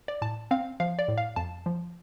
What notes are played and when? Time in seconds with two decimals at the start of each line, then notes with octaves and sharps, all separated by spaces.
0.08 D5
0.22 A2 A5
0.51 C4 F5
0.80 F3 F5
0.99 D5
1.08 A2
1.18 F5
1.36 F2 A5
1.66 F3